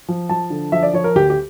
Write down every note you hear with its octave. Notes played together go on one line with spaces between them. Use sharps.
F3
F3 A5
D3
F3 E5
D5
F3 C#5
A#4
D2 G4
G4